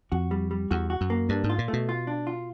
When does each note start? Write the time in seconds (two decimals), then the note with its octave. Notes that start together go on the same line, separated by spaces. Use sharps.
0.12 F2 F#4
0.31 G3
0.51 G3
0.71 E2 F#4
0.90 F#4
1.01 F#2
1.10 A#3
1.29 G2 D4
1.44 G#2
1.50 F4
1.58 A#2
1.68 A3
1.73 B2
1.89 F4
2.07 D4
2.27 F4